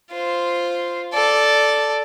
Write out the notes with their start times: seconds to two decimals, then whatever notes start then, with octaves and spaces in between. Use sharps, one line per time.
0.11 F4 C5
1.14 A4 D5